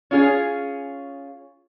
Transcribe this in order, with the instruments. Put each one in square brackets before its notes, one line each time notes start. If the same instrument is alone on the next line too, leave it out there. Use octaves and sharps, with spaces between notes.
[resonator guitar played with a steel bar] C#4 F4 G#4